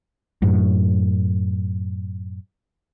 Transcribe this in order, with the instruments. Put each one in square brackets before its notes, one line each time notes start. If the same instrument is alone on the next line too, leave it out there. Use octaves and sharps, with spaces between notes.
[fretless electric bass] F#2 A2